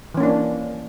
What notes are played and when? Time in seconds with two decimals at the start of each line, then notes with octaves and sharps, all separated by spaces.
0.14 E3
0.17 C#4
0.20 A#3
0.23 D4